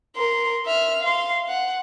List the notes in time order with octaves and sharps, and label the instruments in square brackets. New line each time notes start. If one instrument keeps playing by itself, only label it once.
[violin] A#4 C6
E5 F6
F5 C6
F#5